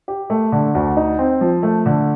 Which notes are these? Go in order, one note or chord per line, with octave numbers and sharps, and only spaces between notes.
G4
A3
D3
D2
D#4
C4
F3
A3
D3